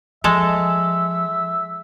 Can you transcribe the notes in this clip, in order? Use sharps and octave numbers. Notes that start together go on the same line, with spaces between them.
F3 G#3 A4 E5